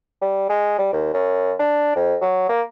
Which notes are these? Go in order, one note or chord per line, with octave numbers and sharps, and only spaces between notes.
G3
G#3
G3
D#2
F#2
D4
F2
F#3
A#3